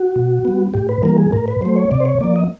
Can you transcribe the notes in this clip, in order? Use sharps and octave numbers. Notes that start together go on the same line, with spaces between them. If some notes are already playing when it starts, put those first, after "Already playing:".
Already playing: F#4
B2
G3 B3
A2 G4
B4
E3 G3 A#3 A#4
G#4
A2 A#4
B4
F#3 A3 C5
C#5
C3 D5
C5
C#5
F3 A#3 D5
D#5